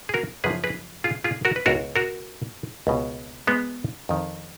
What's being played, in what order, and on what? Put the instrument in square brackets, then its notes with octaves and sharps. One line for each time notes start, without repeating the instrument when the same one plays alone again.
[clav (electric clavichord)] G#4
F#4 A#4
F#2 C#3 F3 G#4 B4
G#4 B4
F4 G#4
F4 G#4
F#4 A#4
B4
C#2 B2 F#4 A#4
F#4 A#4
C#2 B2
G#3 B3
F2 D#3